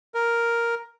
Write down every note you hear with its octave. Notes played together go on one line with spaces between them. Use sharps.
A#4